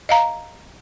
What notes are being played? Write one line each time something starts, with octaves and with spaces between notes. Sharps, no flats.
D#5 F5 A#5